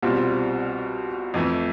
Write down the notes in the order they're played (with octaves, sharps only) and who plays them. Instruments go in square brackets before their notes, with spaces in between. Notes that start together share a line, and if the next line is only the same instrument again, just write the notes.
[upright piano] C2 B2 G3 C4 F4
F2 E3 A3